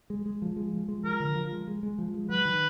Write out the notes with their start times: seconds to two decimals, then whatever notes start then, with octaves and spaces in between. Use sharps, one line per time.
0.10 G#3
0.26 G#3
0.42 F3
0.56 G#3
0.73 F3
0.88 G#3
1.04 F3 A#4
1.20 D3
1.36 F3
1.52 G#3
1.67 G#3
1.83 G#3
1.98 F3
2.14 G#3
2.29 F#3 B4
2.45 D#3